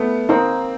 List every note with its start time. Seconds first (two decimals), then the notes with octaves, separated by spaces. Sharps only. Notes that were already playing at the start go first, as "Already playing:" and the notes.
Already playing: A3 B3 B4
0.29 A#3 C4 D#4